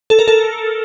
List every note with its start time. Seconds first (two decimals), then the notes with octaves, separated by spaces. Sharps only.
0.10 A4
0.19 A#4
0.28 A4